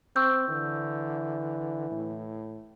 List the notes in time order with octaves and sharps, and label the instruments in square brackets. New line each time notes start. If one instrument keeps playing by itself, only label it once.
[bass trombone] C4 [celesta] C#6 E6 G6
[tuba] D3 [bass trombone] E3
[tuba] A2